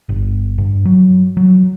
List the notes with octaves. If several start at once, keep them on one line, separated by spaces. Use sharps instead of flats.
G1
G2
F#3
F#3